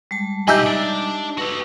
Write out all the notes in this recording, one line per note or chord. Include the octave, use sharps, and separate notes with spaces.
G3 G#3 A5
B2 D#4 G4 E5 G#5 C6 E6 G6
D4
F#4 A4 B4